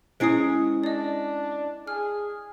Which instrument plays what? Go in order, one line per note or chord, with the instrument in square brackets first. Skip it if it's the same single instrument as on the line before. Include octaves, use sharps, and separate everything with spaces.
[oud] G#3 C#4 [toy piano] E4 C5 [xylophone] D#6 C7 D7
[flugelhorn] D4 [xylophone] D5 D#5
[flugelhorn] G#4 [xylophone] F6